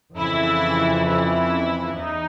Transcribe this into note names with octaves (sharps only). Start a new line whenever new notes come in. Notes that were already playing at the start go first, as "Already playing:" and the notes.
F2 C#3 E3 E4
E4
E2 D#4